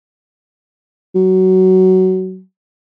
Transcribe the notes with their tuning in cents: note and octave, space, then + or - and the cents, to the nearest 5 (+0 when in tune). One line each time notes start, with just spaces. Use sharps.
F#3 +15